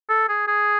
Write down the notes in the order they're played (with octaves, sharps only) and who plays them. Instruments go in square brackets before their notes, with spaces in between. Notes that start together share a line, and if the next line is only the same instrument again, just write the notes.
[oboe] A4
G#4
G#4